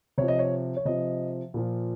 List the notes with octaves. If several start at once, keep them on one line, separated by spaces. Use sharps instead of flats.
C3 F3 C#5
D#5
C#5
C#5
C3 F3 D#5
A#2 F3